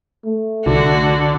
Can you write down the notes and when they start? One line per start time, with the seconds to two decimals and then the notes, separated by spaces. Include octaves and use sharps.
0.25 A3
0.66 C2 D3 F#4